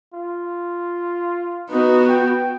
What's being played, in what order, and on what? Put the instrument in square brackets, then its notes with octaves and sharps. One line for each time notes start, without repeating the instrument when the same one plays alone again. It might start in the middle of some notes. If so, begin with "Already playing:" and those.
[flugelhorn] F4
[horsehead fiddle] B3 F#4 [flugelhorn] D#4
[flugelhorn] G5